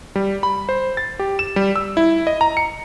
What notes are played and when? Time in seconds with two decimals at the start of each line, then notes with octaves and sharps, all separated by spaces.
0.16 G3
0.43 B5
0.69 C5
0.97 A6
1.19 G4
1.39 E7
1.56 G3
1.76 E6
1.97 E4
2.27 D#5
2.41 A#5
2.57 C#7